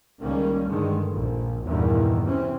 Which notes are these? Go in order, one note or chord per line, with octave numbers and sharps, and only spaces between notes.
C#2 D#3 G3 A#3 C#4
G2 D3 D#3 G#3
A#1
E2 G2 A#2 D#3 E3
C3 E3 C4 C#4